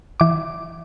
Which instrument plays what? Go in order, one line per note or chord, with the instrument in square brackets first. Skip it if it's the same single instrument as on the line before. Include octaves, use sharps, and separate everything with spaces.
[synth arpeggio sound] E3 D6